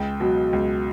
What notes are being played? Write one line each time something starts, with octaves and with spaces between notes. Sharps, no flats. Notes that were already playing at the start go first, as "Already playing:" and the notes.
Already playing: C#2 G5
B2 F#3
C#2